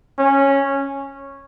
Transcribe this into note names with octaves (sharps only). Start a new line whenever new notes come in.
C#4